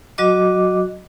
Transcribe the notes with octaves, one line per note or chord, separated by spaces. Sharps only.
F#3 F#4 D#5 D6